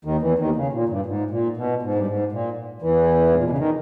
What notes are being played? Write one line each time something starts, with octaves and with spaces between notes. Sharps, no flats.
D#2 D#3
E2 E3
D#2 D#3
C#3
A#2
G2
G#2
A#2
B2
G#2
G2
G#2
A#2
E2 E3
G#2
A#2
B2
C#3
D#3